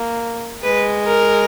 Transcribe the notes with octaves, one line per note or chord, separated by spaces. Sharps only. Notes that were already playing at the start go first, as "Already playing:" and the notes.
Already playing: A#3
G#3 B4
A#4